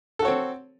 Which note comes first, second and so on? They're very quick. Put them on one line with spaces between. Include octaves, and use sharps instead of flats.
A4 F#4 C#5 C4